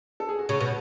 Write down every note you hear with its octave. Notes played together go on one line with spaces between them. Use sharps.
A4
G#4
F#4
C#3 F#4
B2 F#4